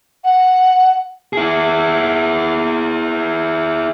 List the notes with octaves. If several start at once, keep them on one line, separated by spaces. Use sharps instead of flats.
F#5
E4 G#4